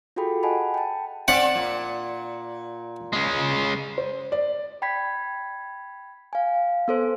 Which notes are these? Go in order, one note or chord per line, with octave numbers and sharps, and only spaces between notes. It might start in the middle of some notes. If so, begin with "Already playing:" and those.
F4 F#4 G#4 A4 G5 B5
D#5 F#5 G#5 A5 B5
G5 A5
C4 D5 F#5
A#2
G#3 C#4
C5
D5
G5 B5 G#6 B6
F5 G#5
B3 A4 C5